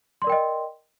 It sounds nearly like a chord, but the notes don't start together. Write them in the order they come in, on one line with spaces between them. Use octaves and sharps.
C6 D5 A#4 G5 D#5